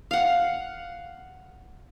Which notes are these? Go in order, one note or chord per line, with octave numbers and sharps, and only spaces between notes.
F5 F#5